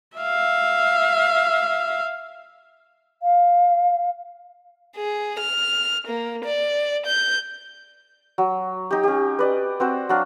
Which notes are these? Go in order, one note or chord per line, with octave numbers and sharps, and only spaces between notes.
E5 F5
F5
G#4
F6
A#3
D5
G6
F#3
D#4 G4
C#4 G4
B4 D5 D#5
C4 F#4 C5
F#3 D4 F5